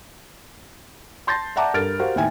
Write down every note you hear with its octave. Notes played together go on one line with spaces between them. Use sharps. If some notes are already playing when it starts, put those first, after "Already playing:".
A5 C6 G6 A6 A#6
D5 E5 F#5 A5 A#5 D6
G2 A4 A#4 F6 A6 D7
F#4 G4 A#4 C5 F5 F#5
D#2 A2 E5 G5 G#5